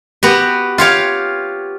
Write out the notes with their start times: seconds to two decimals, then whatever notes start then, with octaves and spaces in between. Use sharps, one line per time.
0.23 B3 F#4 G4
0.78 F4 G4 C#5 F5